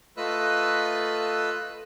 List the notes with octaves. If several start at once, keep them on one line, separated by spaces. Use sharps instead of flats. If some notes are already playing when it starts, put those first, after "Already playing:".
A3 F4 B4 D#5 E6 F#6